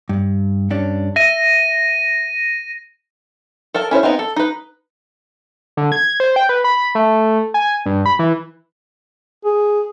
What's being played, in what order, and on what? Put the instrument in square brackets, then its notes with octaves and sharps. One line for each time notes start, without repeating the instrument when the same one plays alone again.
[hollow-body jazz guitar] G2
G2 C#4 D4
[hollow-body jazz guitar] E5 [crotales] A#6 D#7
[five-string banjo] A4 A#4 A5
C#4 E4 C5 C#5
B3 C4 D#4 G#5 A#5
A4
D#4 B4
[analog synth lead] D3
G#6
C5
G5
B4
B5
A3
G#5
G2
B5
E3
[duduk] G#4